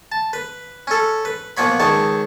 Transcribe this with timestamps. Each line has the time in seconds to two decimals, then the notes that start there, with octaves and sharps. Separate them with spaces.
0.12 A5
0.33 B4
0.87 C#4 A4
1.25 B4
1.57 A#2 F3 B3 C#5 B5
1.80 C#2 D#3 C#5 A5